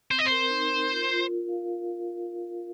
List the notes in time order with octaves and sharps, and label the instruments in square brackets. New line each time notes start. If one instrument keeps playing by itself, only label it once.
[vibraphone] C4 [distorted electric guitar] C5
[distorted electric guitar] D#5
[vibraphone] A#4 [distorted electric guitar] C5
[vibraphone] D#4
A#4
F4
F4
A#4
F5